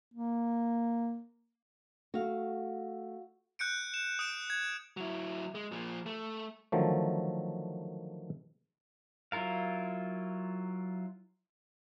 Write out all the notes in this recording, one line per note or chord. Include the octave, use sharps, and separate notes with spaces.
A#3
A3 F#4 F5
F#6 G6 C#7 D7
E7
D#6 D7 E7
G#6
F#3 E4
G#3
A#2 F3
A3
D3 D#3 F3 F#3 A3
F#3 E4 F4 A#4 F5